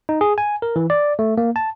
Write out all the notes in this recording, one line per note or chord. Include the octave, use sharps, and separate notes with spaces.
D#4
G#4
G#5
A#4
E3
D5
A3
A#3
A5